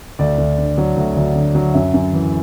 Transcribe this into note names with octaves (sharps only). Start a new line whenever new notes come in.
D2 D5
D2
D3
F#3
D2
D2
D3
F#3
F#2 E5
F#2
E3